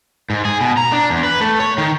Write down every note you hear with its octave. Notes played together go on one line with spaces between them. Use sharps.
G#2
G#4
B2
A#5
D4
E2
B4
A3
C#5
D#3